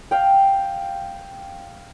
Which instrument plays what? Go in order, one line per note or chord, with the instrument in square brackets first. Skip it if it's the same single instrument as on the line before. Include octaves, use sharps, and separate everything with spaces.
[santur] F5 G5